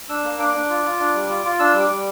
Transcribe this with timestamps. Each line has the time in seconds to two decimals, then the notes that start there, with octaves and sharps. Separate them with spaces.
0.09 D4 E6
0.24 A#3
0.39 D4 D6
0.54 D4
0.70 F4
0.84 F4
1.00 D4
1.14 G3
1.29 F4
1.45 F4
1.59 D4 E6
1.74 G3
1.80 D6
1.90 G3